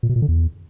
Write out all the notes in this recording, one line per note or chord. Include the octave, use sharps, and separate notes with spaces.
A#2
B2
A#2
D3
E2